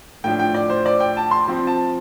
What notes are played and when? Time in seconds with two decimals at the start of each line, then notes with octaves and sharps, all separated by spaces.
0.24 A2 F3 D4 G5
0.39 G5
0.55 D5
0.70 C5
0.86 D5
1.00 G5
1.17 A5
1.31 C6
1.48 F3 C4
1.67 A5